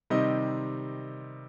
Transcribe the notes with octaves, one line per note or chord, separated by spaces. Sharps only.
C3 D#3 G3 C4 D#4 D#5